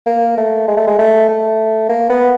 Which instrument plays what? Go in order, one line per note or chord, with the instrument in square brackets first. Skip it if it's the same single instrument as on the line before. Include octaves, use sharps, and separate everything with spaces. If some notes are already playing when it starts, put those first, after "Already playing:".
[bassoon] A#3
A3
G#3
A3
G#3
A3
A3
A#3
B3